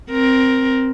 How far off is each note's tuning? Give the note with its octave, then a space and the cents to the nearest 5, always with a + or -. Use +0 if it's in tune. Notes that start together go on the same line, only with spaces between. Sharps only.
C4 +0 A#4 +10